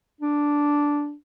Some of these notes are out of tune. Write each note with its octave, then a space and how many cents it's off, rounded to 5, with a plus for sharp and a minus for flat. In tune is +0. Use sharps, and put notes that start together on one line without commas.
D4 -5